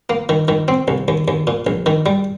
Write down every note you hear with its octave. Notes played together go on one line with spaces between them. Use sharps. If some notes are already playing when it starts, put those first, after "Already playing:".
A#3
D#3
D#3
C4
C2
D#2
D#2
A#2
A#1
D#3
G3